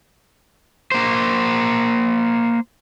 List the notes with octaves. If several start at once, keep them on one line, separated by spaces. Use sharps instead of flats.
A#3 C5